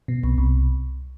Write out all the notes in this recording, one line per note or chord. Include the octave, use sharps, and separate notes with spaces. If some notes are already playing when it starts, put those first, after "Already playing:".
B2
C2
C2